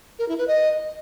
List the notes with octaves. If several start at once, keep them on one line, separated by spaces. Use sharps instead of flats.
A#4
E4
B4
D#5